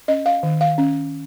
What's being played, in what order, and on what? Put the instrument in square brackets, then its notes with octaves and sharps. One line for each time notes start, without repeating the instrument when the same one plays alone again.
[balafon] C#4 D#5
F5
D#3
F5
C#4